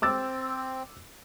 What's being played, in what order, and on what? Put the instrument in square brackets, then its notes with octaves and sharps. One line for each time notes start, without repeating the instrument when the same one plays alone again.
[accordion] C4 [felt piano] D6 E6 A6